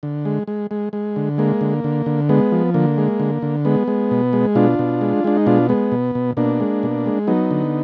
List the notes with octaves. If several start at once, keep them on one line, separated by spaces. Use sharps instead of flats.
D3
G#3
G#3
G#3
G#3
D3
G#3 A#3
D3
D3
D3
G#3 B3
F3
D3 A#3
G#3
D3
D3
G#3 B3
G#3
B2
G#3
B2 D4 F4
B2
G#3
G#3 D4
D#4
B2 D4 F4
G#3 B3
B2
B2
B2 A#3 D4
G#3
B2
G#3
F#3 B3 D#4
D3